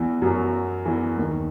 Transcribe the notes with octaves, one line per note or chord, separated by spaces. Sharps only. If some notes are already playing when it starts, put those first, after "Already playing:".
Already playing: E2 E3
F#2 F#3
E2 E3
D#2 D#3